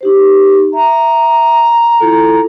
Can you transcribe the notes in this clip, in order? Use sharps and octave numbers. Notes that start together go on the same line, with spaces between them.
D#4 G4 C5
E5 A#5
E4 F4 A4